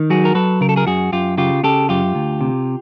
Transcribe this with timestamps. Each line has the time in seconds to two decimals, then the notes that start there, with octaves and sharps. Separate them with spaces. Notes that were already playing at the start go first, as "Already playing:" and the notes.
Already playing: D#3
0.10 F#3 F#4 G#4
0.25 A#4
0.35 F#3 A4 B4
0.61 C#3 A#4
0.69 A4
0.76 G#4 A#4
0.87 F#2 F#4 G#4
1.13 F#2 F4 G4
1.38 C#3 F4 G4
1.63 C#3 G4 A4
1.89 F#2 F4 G4
2.15 D2
2.41 C3